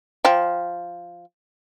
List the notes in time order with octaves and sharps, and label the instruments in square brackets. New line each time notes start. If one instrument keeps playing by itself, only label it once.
[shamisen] F3 G5